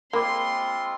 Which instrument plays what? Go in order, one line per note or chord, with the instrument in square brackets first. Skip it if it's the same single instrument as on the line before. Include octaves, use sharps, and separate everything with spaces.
[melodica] G#3 C4 F4 [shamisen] A#3 [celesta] B5 D6 [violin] C6